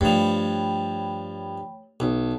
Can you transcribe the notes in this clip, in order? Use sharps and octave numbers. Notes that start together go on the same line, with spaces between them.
G2 F3 A3 C#5 G5 B5
B1 A5